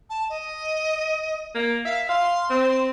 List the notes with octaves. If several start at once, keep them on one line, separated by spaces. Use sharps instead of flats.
A5
D#5
A#3
E5 F5
F5 C6
C4